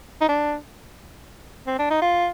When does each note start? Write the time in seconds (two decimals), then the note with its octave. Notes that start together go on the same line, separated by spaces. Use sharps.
0.21 D#4
0.29 D4
1.67 C4
1.79 D4
1.90 D#4
2.02 F4